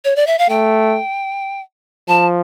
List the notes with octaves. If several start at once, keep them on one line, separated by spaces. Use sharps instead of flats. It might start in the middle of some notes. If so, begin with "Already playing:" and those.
C#5
D5
E5
F5
A3 G5
F3 A5